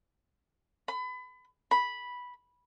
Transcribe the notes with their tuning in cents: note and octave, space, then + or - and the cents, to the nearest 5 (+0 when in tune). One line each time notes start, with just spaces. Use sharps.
B5 +30
B5 -5